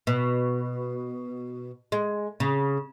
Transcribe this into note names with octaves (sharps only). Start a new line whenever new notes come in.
B2
G#3
C#3